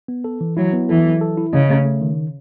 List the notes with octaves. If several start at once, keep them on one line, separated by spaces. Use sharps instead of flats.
B3
A4
E3
F#3 E4
B3
E3 A4
F#3
A4
E4
C#3 D#5
A3
A3
D#3